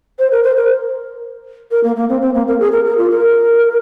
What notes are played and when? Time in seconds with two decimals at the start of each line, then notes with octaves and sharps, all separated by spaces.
0.19 C5
0.31 A#4
0.43 C5
0.56 A#4
1.71 A#4
1.84 A#3
1.96 A#3
2.09 C4
2.21 C4
2.34 A#3
2.47 A#4
2.60 G#4
2.72 A#4
2.85 A#4
2.98 F4
3.10 A#4